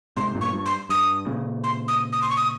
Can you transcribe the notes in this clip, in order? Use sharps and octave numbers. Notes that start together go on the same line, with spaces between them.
G#2 C3 C6
G2 A#2
C#6
G2
C6
G2 D#6
A#2 C#3
C6
D#6
D#6
C6
C#6
D#6